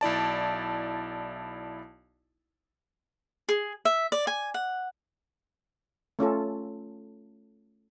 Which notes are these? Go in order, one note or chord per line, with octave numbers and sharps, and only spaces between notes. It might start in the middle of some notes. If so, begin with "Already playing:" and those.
B1 E4 D5 A5
G#4
E5
D5
G#5
F#5
A3 C#4 F4 A4